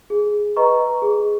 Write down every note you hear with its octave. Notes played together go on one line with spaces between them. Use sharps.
G#4
B4 D#5 A#5 C#6
G#4